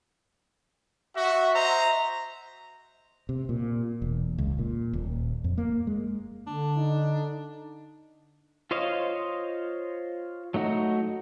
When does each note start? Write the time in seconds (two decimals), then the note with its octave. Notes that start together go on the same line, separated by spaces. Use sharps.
1.16 F#4 E5
1.55 C5 D#5 E5 A#5
3.29 C3
3.49 A#2
4.02 E1
4.38 C#2
4.59 A#2
4.93 D#1
5.44 F2
5.58 A#3
5.87 G#3
6.47 D3 D4
6.77 D#4
8.71 F4 C5 C#5 D#5 F5
10.54 F#3 A3 D#4 F#4